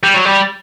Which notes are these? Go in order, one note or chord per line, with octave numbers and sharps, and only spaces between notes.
G3
F#3
G3